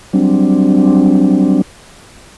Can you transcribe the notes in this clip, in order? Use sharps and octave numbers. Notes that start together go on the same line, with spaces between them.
F#3 G3 C4 D4